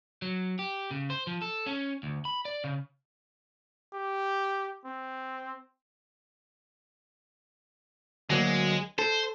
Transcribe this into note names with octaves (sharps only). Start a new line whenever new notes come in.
F#3
G4
C#3
C5
F3
A4
C#4
D2
B5
D5
C#3
G4
C4
D2 F#3 G#3 A#3
A4 C5